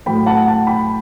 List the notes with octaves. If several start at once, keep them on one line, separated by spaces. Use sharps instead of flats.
A2 F#3 A3 G5 B5
F#5 A5
F#5 A5
G5 B5